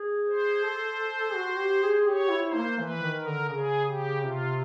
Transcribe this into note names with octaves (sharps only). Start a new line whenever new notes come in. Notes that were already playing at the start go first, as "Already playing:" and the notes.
Already playing: G#4
C5
A4
F#4
G4
G#4
G4 C#5
E4
C5
A#3
E3 B4
D#3
A#4
D3
C#3 G#4
G4
C3 F4